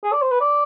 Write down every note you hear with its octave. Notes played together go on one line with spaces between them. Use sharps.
G#4
D5
C5
B4
D5